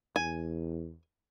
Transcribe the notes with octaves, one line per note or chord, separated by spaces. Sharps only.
E2 G#5